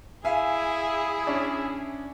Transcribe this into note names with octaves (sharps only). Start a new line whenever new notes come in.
E4 G#4 E5 F5 G#5
C#4 D4